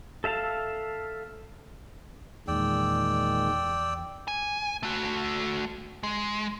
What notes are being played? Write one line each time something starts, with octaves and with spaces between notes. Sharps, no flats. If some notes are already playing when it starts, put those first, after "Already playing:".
A4 E5 F5 A5
E2 A#2 D#3 G#3 D5 G5 E6
G#5
A3 F#4
G#3